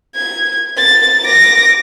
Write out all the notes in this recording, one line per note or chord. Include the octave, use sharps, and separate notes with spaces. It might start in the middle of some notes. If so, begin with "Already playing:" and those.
G#6
A6
D6 A#6